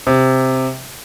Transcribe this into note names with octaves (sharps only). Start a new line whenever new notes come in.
C3